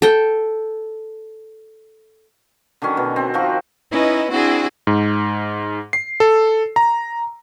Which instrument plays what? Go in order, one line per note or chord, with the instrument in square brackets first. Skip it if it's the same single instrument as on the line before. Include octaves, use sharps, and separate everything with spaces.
[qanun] A4 G5
[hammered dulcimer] D3 D#3 F#3 C#4
B2
C4
D#3 F3 F#4 A#5
[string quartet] C#4 D#4 E4 B4 D#5
C4 D4 E4 F#4 G#4
[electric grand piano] G#2
C7
A4
A#5